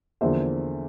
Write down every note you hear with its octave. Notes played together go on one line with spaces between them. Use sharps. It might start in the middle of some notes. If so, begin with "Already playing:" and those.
E2 D3 F3 A#3 C5 E5